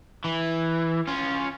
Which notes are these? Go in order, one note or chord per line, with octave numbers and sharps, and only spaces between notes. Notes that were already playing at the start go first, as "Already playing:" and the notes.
E3
C#4 F4